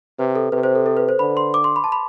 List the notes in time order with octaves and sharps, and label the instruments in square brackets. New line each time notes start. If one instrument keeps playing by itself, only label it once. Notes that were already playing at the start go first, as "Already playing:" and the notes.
[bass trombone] C3 [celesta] B4
[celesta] A4
[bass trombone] C3 [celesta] B4
[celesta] C5
A4
A4
B4
C5
[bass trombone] D3 [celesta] B5
[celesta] C6
D6
C6
B5
A5
B5